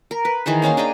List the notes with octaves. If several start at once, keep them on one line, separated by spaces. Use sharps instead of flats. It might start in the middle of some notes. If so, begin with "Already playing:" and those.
A#4
B4
D#3 E3 G#4 C5
A#3 C#4 D#4 F5
D4 G#4 D#5 G5